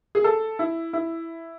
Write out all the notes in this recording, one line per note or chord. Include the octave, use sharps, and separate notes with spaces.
G#4
A4
E4
E4